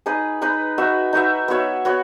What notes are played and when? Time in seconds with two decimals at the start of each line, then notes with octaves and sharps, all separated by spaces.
0.06 D#4 G#4 B4 D#5
0.41 D#4 G#4 B4 D#5
0.78 D#4 F#4 B4 E5
1.13 D#4 F#4 B4 E5
1.48 B3 F#4 C#5 E5
1.85 B3 F#4 C#5